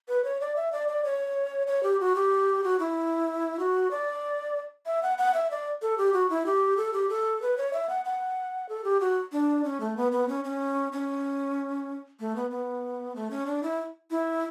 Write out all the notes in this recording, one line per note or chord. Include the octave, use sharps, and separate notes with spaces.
B4
C#5
D5
E5
D5
D5
C#5
C#5
G4
F#4
G4
F#4
E4
F#4
D5
E5
F#5
F#5
E5
D5
A4
G4
F#4
E4
G4
A4
G4
A4
B4
C#5
E5
F#5
F#5
A4
G4
F#4
D4
C#4
A3
B3
B3
C#4
C#4
C#4
A3
B3
B3
A3
C#4
D4
E4
E4